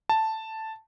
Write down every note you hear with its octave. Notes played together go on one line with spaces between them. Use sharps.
A5